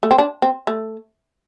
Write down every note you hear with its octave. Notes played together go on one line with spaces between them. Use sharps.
A3
C4
D4
C4
A3